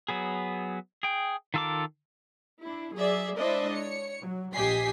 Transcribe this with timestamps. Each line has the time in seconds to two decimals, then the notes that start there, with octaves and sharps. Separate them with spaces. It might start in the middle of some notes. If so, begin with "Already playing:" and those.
0.09 F#3 B3 G#4
1.03 G#4 G5
1.54 D#3 F4 A4 A#4 D6
2.62 D4 E4
2.94 F#3 G#4 D5 E5
3.37 G#3 D4 E4 C5 D#5 E5
3.73 C#5 C#7
4.20 F#3
4.54 A#1 G4 D#5 G#5 B6 C7